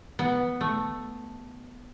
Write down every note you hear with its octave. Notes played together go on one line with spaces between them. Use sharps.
B3
A3